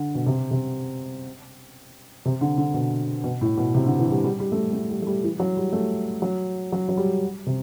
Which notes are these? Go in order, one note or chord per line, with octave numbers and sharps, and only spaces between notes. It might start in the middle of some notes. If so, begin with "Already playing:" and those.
Already playing: D3
B2
C3
C3
C3
D3
D3
B2
B2
A2
B2
C3
D3
E3
G3
G3
G3
A3
G3
A3
G3
A3
G3
E3
F#3
G3
A3
F#3
F#3
F#3
G3
C3